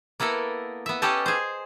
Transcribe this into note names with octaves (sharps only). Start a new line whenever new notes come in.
A#3 B3 E4 A4 A#4
B3 E5
B3 C#4 G4 A4 D#5 A5
G#4 C5